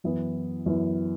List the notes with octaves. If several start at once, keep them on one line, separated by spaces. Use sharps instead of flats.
F#2 E3 B3 E4
F#2 E3 B3 E4